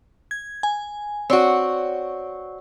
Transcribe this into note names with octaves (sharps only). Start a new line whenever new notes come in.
G#6
G#5
C4 F#4 C#5 D5 C#6